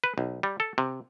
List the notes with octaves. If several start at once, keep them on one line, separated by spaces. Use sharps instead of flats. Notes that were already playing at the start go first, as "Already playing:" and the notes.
B4
B1
G3
A4
C3